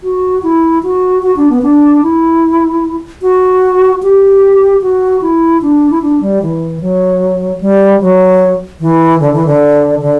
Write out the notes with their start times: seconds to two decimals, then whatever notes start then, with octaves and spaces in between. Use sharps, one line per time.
0.03 F#4
0.43 E4
0.83 F#4
1.23 F#4
1.36 D4
1.49 B3
1.62 D4
2.03 E4
3.22 F#4
4.02 G4
4.81 F#4
5.21 E4
5.62 D4
5.90 E4
6.01 D4
6.21 G3
6.42 E3
6.81 F#3
7.61 G3
8.01 F#3
8.80 E3
9.20 D3
9.33 E3
9.46 D3
10.00 D3